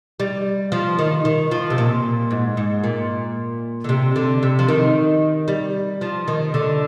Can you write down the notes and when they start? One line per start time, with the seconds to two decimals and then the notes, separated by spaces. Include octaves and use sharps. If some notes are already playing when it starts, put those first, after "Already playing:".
0.20 G3
0.72 F3
0.99 D#3
1.25 D#3
1.51 F3
1.70 C3
1.78 A#2
2.31 G#2
2.57 G#2
2.84 A#2
3.84 D3
3.89 C3
4.16 D3
4.43 C3
4.59 F3
4.68 D#3
5.48 G3
6.01 F3
6.28 D#3
6.54 D3